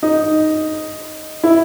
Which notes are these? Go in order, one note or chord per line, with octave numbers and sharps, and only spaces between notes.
D#4
E4